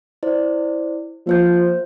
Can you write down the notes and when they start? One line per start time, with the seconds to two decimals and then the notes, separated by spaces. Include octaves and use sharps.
0.23 E4 C5 D5
1.27 F3 A#3 C5 G6